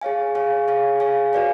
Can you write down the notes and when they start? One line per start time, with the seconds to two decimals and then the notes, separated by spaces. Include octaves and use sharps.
0.01 G#4 C#5 F5 G#5
0.35 G#4 C#5 F5 G#5
0.68 G#4 C#5 F5 G#5
1.00 G#4 C#5 F5 G#5
1.33 F#4 B4 D5 F5 G#5